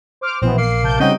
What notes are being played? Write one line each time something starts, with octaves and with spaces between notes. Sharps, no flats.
C5 D6 F6
A#1 B2 E3 B3 C4
A#3 C7
C3 A5 G6
C#3 G3 C4 D#4 F#4 G5